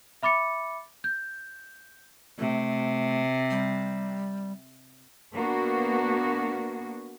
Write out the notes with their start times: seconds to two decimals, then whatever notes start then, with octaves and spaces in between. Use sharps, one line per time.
0.23 E5 B5 D6 A6 C#7
1.04 G6
2.39 C3 A3
3.50 G3
5.33 A#3 B3 D4 F#4